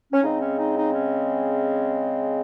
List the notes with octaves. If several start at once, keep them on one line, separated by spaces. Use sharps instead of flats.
C#4
C#3 G#3 C4 D#4
C#4
D#4
D#4
C#4